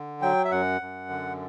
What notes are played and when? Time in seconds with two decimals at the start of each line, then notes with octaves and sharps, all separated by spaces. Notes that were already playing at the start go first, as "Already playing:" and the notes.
Already playing: D3
0.22 F#3 G5
0.45 E5
0.51 F#2 F#5
0.81 F#2
1.09 D3